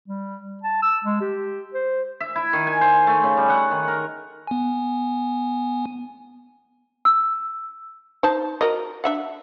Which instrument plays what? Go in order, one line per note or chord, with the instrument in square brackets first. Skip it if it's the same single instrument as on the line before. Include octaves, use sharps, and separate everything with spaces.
[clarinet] G3
A5
E6
G#3
G4
C5
[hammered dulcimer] E5
E4
D#3
G#5
C5
A3
C#3
G3
F#5
D#3
A#4
[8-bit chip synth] B3 G#5
[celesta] E6
[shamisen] D#4 C5 A5
F#4 A#4 D#5
D4 E5 F#5